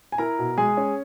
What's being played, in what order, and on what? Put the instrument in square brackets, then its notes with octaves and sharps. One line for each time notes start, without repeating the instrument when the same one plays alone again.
[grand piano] G#5
E4 A#4 A#5
B2
G#3 G#4 G#5
C#4